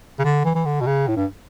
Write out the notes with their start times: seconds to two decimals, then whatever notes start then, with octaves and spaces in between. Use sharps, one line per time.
0.19 C#3
0.24 D3
0.45 E3
0.55 E3
0.66 D3
0.81 B2
0.87 C#3
1.08 A2
1.16 G2